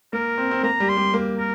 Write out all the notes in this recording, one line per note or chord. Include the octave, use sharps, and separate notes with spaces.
A#3 A#4
C4
C4
A#3 A#5
G3
C6
G3
A#3
A#4